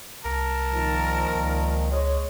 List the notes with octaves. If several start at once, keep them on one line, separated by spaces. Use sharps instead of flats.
C2 A#4 A5
A#2 D#3 F3
C#2
G#3 C#5